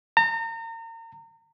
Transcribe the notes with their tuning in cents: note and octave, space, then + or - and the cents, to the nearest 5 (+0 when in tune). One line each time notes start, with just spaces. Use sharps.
A#5 -35